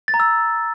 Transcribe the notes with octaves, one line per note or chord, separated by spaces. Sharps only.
A6
A#5
E6